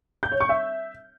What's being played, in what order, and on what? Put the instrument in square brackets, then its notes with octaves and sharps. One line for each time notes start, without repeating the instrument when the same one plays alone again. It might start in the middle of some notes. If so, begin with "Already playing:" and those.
[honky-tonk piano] G6
C#5
C#6
E5